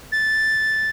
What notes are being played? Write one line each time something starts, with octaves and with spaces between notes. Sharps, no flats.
A6